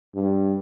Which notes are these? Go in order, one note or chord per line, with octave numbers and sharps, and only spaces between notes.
G2